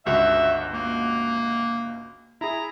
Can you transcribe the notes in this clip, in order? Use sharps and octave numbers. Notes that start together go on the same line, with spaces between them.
G1 C#2 F#4 E5
A#3
E4 G#4 A#5